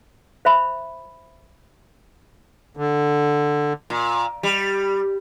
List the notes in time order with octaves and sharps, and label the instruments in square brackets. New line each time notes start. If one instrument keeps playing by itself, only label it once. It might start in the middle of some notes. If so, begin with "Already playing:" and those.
[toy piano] C5 E5 B5
[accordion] D3
[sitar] A#2
G3